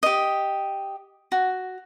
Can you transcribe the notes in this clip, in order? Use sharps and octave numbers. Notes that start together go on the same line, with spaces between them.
G4 D#5
F#4